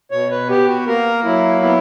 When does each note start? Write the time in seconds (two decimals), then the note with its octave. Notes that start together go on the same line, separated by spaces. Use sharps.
0.11 B2 C#5
0.31 B4
0.49 B3 G4
0.68 F#4
0.87 A#3 A#4
1.24 F#3 E4
1.62 B3 E4